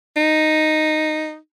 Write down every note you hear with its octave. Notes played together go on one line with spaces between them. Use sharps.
D#4